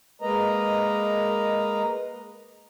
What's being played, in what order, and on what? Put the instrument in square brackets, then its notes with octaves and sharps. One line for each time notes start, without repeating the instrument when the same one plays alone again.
[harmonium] G#3 A#3 A#4 B4 D#5 A#5